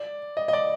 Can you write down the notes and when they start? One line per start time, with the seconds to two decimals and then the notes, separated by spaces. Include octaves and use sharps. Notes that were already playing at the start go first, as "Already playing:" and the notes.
Already playing: D5
0.37 D#5
0.48 D#5
0.53 D5